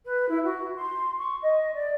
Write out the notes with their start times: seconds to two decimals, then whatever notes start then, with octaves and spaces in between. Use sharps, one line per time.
0.05 B4
0.28 E4
0.44 F#4
0.76 C6
1.18 C#6
1.42 D#5
1.74 D5